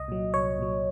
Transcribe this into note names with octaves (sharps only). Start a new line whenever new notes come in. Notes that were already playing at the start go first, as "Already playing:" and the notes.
Already playing: C2 D#5
A#2 F#3
C2 C#5
A#2 F#3